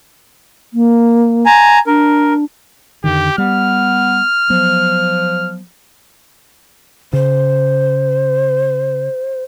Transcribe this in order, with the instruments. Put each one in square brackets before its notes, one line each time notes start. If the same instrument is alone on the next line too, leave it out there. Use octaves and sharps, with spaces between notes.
[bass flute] A#3
[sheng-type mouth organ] G#5 A#5
[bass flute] D4 [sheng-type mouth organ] A#4
[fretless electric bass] F2 D3 D#3 [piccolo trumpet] G4
[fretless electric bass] G3 [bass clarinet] B3 [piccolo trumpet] F6
[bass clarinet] F3 [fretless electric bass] F#3 B3
[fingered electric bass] C#3 [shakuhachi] C5